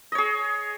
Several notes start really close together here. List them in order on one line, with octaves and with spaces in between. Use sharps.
D#5 C#5 G#4